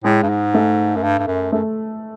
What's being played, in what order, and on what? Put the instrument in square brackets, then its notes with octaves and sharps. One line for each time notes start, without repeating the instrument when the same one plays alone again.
[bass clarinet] A2 [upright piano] G#3
[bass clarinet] G2
G#2
[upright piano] A3
[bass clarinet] F#2
G2
G2
F#2
[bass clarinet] F#2 [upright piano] A3